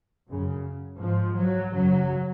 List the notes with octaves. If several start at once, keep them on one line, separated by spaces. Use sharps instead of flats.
F#2 C#3
G#2 F3
F#3
F#2 C#3 F#3